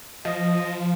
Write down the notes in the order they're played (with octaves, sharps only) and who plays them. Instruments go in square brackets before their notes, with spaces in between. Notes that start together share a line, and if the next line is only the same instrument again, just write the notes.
[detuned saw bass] F3 [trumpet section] D#5